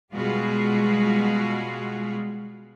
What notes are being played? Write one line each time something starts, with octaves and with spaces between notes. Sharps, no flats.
B2 G3 G#3 F4 F#4 G#4